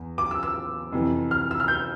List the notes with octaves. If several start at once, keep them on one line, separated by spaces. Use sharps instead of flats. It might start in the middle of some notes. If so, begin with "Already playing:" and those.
Already playing: E2
D6
E6
E6
F2 C3 E3
F6
E6
F6
G6